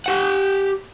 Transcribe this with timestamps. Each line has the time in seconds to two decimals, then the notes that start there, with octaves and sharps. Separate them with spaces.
0.06 G4 F#5